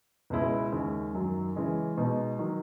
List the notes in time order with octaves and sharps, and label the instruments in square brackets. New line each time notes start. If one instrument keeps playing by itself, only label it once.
[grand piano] C#2 B2 G#3 C#4 E4
D#2 C#3 G#3
F#2 D#3 F#3
C#3 E3 G#3
B2 G#3 D#4
D#3 F#3